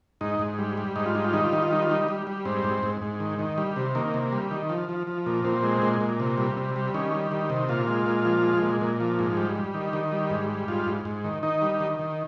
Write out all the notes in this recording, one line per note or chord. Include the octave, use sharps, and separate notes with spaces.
G#2 D#4
G#2
G3
G3
G#2 D#4
F4
G3 D#4
F4
D#3 D#4
F4
D#3 D#4
F4
G3 D#4
F4
G3 D#4
G3
G3
G#2 C4
G#2
G#2
G#2
D#3
D#3
G3
C3
D#3 A#3
C3
G3
D#3
F3
F3
F3
A#2
A#2 C4
G#3
A#2
A#2
C3
G3
C3
G3
D#3 C#4
G3
D#3
C3
A#2 F4
G#3
A#2
F3
G#3
A#2
A#2
F3
G#2
G3
G3
D#3
D#3
G3
G#2
G3
G#2 F4
G#2
G#2
D#3
D#3 D#4
G3
D#3
D#3